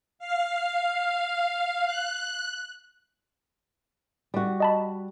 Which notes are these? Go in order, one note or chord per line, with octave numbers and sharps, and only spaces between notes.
F5
F#6
G3 F#4
D#5 A5 B5